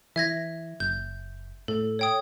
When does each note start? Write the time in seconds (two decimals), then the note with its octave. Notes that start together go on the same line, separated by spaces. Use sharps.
0.16 E3 E5 G#6 A#6
0.80 F#1 G6
1.68 A2 A4
1.99 C#5 G5 D#6